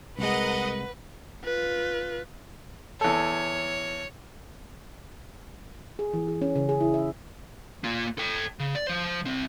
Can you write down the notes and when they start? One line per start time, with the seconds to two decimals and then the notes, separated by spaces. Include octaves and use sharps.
0.18 C2 G#3 A#4 B4 D#5 F#5
1.44 F4 B4
3.01 E2 A4 C#5
5.99 G#4
6.14 E3
6.28 G#4
6.42 C#4
6.56 C#3
6.69 G#4
6.81 E4
6.94 E5
7.84 A#3 F4
8.18 A4 G5
8.59 C#3
8.75 D5
8.87 F3 C5
9.25 C2 C4